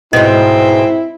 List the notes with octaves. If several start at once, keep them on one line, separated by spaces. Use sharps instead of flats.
G#2 B2 C4 E4 D#5